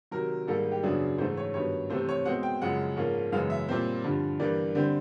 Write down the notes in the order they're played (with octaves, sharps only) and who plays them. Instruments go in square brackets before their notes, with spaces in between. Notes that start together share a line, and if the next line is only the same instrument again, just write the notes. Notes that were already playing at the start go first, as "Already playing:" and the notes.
[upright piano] C3 D#3 F#3 A#4
G#2 D#3 G3 A#3 A4
G4
F#2 C#3 F#3 B3 D4 G#4
G#2 E3 A3 C5
C#5
G2 D#3 F#3 B3 C#5
C3 E3 A3 C4 C5
C#5
B2 G#3 C4 F#5
G5
F#2 C#3 F3 G#3 F#5
G#2 F3 A#3 C#4
F#2 C#3 E3 G#3 B3 F5
E5
A#2 G3 C4
G2 D3 F3
G2 E3 G3 A#3 D5
D3 G3 C4